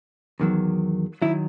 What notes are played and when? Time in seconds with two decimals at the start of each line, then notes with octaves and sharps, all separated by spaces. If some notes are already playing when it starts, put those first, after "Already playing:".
0.40 E2 D#3 F#3
1.22 D#3 F#3 E4